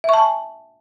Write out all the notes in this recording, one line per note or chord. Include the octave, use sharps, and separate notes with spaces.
E5 G#5 A5 C#6